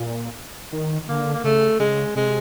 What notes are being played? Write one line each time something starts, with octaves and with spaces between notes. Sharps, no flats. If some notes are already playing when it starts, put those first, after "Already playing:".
Already playing: A#2
D#3
D3 A#3
A#3
C#3 A3
C#3 G#3
C3 G#3